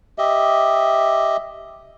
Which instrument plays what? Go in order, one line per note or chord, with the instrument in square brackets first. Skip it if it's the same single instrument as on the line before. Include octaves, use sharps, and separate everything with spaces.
[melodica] G4 D#5 E5